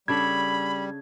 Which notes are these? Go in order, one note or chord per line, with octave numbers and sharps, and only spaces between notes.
C#3 G3 D4 A4 B5 G#6